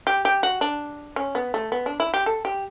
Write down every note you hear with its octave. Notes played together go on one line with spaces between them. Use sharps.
G4
G4
F#4
D4
C#4
B3
A3
B3
D4
E4
G4
A4
G4